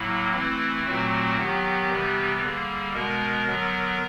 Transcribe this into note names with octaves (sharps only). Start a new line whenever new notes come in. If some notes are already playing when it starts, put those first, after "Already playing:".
Already playing: A2 F#3 A#3 E4
E3 A3 C4 E4
A#2 F#3 A3 C4 F#4
D#3 F#3 B3 G4
C3 E3 G3 B3
D3 G3 A#3 G#4
B2 G#3 B3 A#4
D3 F#3 B3